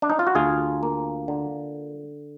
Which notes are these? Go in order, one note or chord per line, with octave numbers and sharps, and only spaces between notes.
D4
D#4
F4
F#4
D2 F4 G#4
A#3
D3